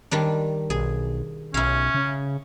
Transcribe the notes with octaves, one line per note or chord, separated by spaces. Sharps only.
D#3 G3 D4
B1 G#4
B1 C#4 E4 F5
C#3